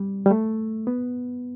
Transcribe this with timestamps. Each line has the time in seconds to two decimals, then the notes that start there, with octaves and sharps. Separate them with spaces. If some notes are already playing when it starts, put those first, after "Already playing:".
Already playing: G3
0.26 G3
0.31 A3
0.87 B3